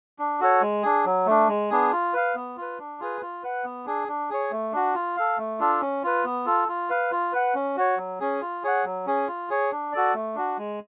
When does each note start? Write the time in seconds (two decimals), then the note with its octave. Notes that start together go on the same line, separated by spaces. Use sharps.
0.19 D4
0.40 F#4 A4 C#5
0.61 G#3
0.83 D4 G#4
1.05 F#3
1.26 A3 D4
1.48 G#3
1.70 B3 D4 G#4
1.92 F4
2.14 B4 F5
2.35 B3
2.57 F4 B4
2.79 D4
3.00 F4 G#4 B4
3.21 F4
3.43 B4 F#5
3.64 B3
3.86 D4 G#4
4.08 D4
4.30 G#4 C#5
4.51 A3
4.73 D4 F#4
4.95 F4
5.17 A4 F5
5.38 A3
5.60 D4 F4 A4
5.81 C#4
6.03 F4 B4
6.24 B3
6.46 F4 A4
6.68 F4
6.90 B4 F5
7.11 F4
7.33 B4 F#5
7.55 C#4
7.77 F#4 C#5
7.97 F#3
8.20 C#4 G#4
8.41 F4
8.63 G#4 C#5 F#5
8.84 F#3
9.06 C#4 G#4
9.28 F4
9.50 G#4 C#5
9.72 D4
9.93 F#4 A4 D5
10.14 A3
10.35 D4 F#4
10.58 G#3